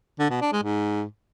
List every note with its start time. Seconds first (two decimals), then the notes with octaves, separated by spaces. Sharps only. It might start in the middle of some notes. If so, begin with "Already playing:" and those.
0.19 D3
0.30 B2
0.41 D4
0.52 G#3
0.63 G#2